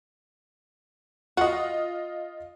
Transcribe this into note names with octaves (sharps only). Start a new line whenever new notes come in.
F4 F#4 D#5